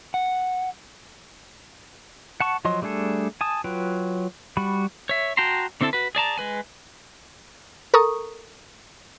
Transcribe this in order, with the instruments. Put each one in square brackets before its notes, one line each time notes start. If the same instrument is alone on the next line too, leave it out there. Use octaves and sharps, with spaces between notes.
[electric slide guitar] F#5
[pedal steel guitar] F#5 A5 C#6
F3 F#3 D#5 C6
G3 A3 D4 G#4 A4
G#5 A5 D#6
F#3 F4 B4 G5
G3 F#4 B5
C#5 E5
F#4 G5 A5 A#5 C6
D3 C4 E4 A4 A5
F#4 B4
G#4 D5 A5 A#5
G#3 B4 G#5
[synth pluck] A4 A#4 A#5 C#6 D#6